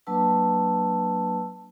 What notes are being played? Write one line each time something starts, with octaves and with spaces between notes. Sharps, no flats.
F#3 A#3 D4 B4 A5 E6